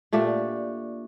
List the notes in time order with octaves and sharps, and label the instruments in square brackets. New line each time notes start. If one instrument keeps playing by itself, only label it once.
[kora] A#2 A3 D4 G4